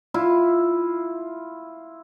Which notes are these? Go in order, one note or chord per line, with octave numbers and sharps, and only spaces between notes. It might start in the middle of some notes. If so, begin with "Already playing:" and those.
E4 F4